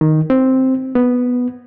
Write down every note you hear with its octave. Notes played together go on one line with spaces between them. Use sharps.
D#3
C4
B3